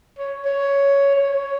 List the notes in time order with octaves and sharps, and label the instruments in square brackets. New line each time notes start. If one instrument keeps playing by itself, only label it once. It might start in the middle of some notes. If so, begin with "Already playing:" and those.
[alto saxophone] C#5
C#5
C#5